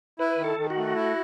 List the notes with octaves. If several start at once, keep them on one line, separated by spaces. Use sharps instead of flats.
E4 B4
D#3
A4
D#3
F#4
A3
E4